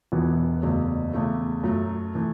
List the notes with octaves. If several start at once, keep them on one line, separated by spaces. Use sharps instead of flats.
E1 E2 E3 B3 F#4
F#1 E2 C#3 F#3 A3
E2 C#3 A3
F#2 F#3 A3
E3 A3